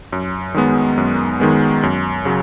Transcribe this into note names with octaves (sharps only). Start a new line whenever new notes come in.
F#2
D#3 G#3 B3
F#2
D#3 G#3 B3
F#2
C#3 F#3